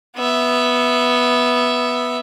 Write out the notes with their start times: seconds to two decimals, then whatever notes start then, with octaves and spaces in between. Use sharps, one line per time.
0.17 B3 E5